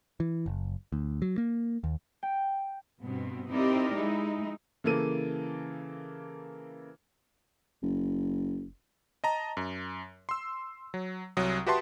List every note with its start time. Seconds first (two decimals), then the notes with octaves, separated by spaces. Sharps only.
0.20 E3
0.46 F#1
0.92 D2
1.22 F#3
1.38 A#3
1.84 D#2
2.23 G5
3.02 G2 B2 B3 C4
3.50 C4 D#4 E4 G4 A#4 D5
3.94 G#3 D#4 E4
4.84 C#3 E3 A#3 A4 D#7
7.83 F#1
9.24 D#5 A5 A#5
9.57 F#2
10.29 C6 E6
10.94 F#3
11.37 C2 F#3 D#6
11.67 F#4 G4 B4 E5 A5 C6